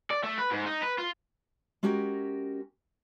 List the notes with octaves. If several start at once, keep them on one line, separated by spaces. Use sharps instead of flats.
D5
A3
B4
G#2
D#4
B4
F4
G#3 C#4 F#4 G4 A#4